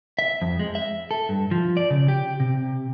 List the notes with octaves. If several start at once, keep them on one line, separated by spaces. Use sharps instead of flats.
E5
F2
G#3
E5
A4
G2
F3
D5
C#3
G4
C3